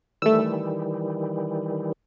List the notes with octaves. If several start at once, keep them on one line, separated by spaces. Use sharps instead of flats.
D#3 E3 G3 A3 E6